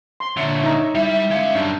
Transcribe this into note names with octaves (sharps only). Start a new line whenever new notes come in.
C6
A#2 D3 F4 C#5 E5
D#4 A#5
G3 E4 E5
G#3 F5
F#2 G3 D4